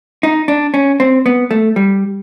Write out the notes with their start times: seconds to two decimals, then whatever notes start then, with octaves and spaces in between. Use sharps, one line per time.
0.23 D#4
0.48 D4
0.74 C#4
1.00 C4
1.26 B3
1.51 A3
1.76 G3